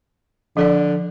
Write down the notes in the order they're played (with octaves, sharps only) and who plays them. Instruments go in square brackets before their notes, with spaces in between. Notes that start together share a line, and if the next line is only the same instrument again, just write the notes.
[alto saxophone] D3 [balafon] F3 A4 D5